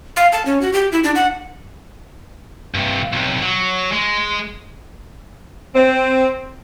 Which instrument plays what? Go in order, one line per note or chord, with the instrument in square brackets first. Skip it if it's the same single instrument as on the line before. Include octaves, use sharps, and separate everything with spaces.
[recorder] F5
A5
C#4
F#4
G4
E4
D4
F#5
[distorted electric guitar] G2 C3
B1 C3
F#3
G#3
[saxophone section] C4